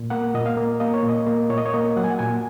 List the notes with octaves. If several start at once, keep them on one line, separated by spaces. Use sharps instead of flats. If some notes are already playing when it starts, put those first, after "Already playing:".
Already playing: A#2
A#3 F#5
A#2 D#5
F5
A#3
A#3 D#5
C#5
A#2
D#5
A#3
A#2 C#5
D#5
C#5
A#3 D#5
F#3 F#5
G#5
F#5
A#2 G#5